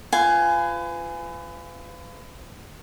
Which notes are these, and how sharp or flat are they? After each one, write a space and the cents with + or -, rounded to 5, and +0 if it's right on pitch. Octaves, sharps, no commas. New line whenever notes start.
F4 -15 B4 +35 G#5 +0